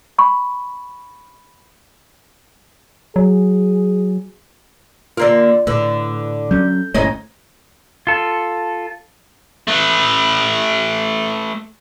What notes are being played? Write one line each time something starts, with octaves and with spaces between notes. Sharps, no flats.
B5 C#6
F#3 G#4
D3 A#3 F4 A#4 D5
A2 D3 B4
F#3 C#4 G6
G1 G#2 A3 C#4 D#4 E4 C#5 D#5
F4 A4
A3 B4